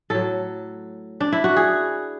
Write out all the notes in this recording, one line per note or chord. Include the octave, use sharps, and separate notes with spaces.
A2 F#3 A4
D4
E4
F#4
G#4